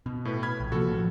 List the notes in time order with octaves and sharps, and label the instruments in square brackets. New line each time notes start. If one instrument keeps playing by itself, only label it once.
[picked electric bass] B2
[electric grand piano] A2 B4
B5 F6 G#6
[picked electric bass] A#1
[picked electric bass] C3 F3 A#3 [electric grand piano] F#4 A4
[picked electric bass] A2 F3